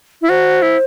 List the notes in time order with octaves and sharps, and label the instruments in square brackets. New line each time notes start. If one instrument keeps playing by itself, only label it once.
[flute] E4
[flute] F#4 [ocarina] C5
[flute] E4